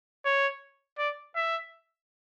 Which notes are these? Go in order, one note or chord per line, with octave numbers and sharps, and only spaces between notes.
C#5
D5
E5